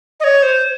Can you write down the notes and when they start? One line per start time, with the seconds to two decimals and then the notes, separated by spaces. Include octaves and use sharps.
0.20 D#5
0.24 C#5
0.43 C5